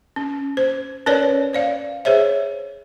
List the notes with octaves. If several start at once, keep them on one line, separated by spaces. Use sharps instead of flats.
C#4
C5
C#4 A#4 B4 C#5 D5
C5 D5 F5
G#4 C5 C#5 E5